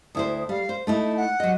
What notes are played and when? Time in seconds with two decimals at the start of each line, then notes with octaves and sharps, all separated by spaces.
0.15 D2 E4 C5 D#6
0.49 G3 F5
0.69 C5
0.87 A3 D#4 E4 A5
1.17 F#5
1.40 F#3 D#5